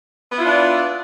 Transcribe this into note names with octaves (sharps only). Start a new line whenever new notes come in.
B3 D4 E4 F4 D5